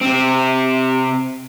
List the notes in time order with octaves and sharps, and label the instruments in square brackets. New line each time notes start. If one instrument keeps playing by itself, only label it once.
[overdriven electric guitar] C3 C4